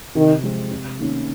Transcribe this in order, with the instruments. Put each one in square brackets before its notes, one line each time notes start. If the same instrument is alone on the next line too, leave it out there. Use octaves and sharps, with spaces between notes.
[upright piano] C3 [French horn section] D#3
[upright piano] F3 G#3 C4
C3
D#3 A#3 C#4